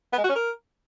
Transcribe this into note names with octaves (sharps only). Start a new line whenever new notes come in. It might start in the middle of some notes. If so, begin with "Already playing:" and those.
B3
G#3
F#4
C#4
A#4